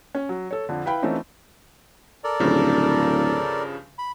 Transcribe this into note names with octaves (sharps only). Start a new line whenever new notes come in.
C#4
F#3
A4 C#5
F2 D3
E4 B4 F5 G5 B5
E3 A3 C4 C#4 D#4 F4
A4 A#4 D5
D1 G2 C#3 F3
B5